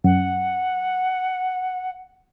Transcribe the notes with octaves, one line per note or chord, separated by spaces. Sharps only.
F#2 F#5